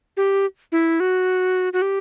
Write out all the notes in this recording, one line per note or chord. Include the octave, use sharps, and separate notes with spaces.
G4
E4
F#4
F#4
G4